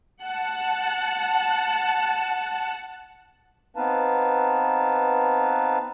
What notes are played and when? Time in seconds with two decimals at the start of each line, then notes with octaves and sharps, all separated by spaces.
0.23 F#5 A5
3.76 B3 C4 D#4 B4 F5 A5